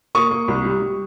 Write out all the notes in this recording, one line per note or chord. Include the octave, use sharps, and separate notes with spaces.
A#3 C#6 D#6
A#3
C2
G3
G3